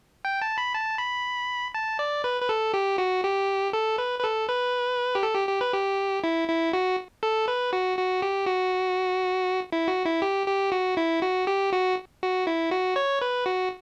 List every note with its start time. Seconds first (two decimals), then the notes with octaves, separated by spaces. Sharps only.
0.25 G5
0.42 A5
0.58 B5
0.74 A5
0.99 B5
1.75 A5
1.99 D5
2.24 B4
2.42 B4
2.49 A4
2.74 G4
2.98 F#4
3.24 G4
3.73 A4
3.98 B4
4.19 B4
4.23 A4
4.48 B4
5.15 G4
5.23 A4
5.35 G4
5.48 G4
5.61 B4
5.74 G4
6.24 E4
6.48 E4
6.73 F#4
7.23 A4
7.48 B4
7.73 F#4
7.98 F#4
8.22 G4
8.47 F#4
9.72 E4
9.88 F#4
10.06 E4
10.22 G4
10.47 G4
10.72 F#4
10.97 E4
11.22 F#4
11.47 G4
11.72 F#4
12.22 F#4
12.47 E4
12.72 F#4
12.96 C#5
13.22 B4
13.46 F#4